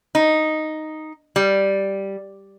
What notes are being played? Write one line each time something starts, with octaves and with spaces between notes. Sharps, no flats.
D#4
G3